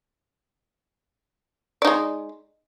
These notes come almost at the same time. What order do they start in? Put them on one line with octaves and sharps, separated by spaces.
D5 D#4 G#3